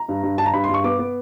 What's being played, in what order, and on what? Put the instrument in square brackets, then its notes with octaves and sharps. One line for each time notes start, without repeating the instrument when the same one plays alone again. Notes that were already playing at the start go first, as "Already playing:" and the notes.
Already playing: [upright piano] A#5
G2
G2
G2 A5
A#5
G2 B5
C6
G2
C#6
B3 D6
B3